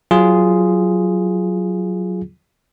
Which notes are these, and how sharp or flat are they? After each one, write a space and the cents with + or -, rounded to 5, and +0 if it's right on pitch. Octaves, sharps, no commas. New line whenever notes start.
F#3 +0 F4 -10 G#4 +0